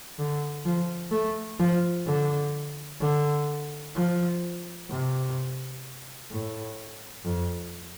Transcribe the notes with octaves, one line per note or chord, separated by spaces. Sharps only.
D3
F3
A3
F3
D3
D3
F3
C3
A2
F2